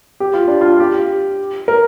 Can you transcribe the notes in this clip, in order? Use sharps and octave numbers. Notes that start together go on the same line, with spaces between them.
G4
F4
D4
F4
F4
G4
A#4